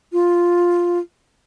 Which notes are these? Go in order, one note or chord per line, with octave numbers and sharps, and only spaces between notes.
F4